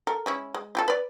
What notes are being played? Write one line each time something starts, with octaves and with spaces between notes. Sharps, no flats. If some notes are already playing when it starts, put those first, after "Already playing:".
A4 A#4
G#3 C#4 E4
G#3
F4 G4 A4
B4 D5